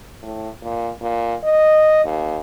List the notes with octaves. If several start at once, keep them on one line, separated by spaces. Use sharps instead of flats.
A2
A#2
A#2
D#5
D#2